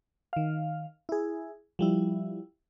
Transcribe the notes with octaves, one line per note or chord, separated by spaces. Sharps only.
D#3 F5
E4 G#4
F3 G3 E4